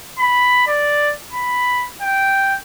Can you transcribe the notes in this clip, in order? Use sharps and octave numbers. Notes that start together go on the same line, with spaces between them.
B5
D5
B5
G5